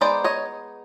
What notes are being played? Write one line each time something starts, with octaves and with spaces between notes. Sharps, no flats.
G#3 B3 D#4 C5 D5
C#5 D#5